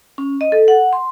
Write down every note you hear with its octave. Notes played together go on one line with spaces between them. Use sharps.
C#4
D#5
A4
F#5
C6